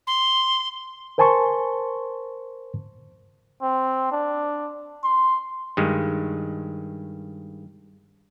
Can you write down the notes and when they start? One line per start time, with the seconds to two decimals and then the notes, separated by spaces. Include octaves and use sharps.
0.07 C6
1.18 A#4 C5 G#5 A5 C6 C#6
3.62 C4
4.12 D4
5.04 C6
5.77 G2 D#3 G#3